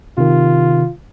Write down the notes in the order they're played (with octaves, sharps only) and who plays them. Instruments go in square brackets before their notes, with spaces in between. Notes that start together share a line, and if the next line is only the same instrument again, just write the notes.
[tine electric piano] C3 D#3 [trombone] F4